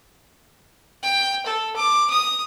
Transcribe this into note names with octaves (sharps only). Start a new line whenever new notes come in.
G5
A4
D6
D#6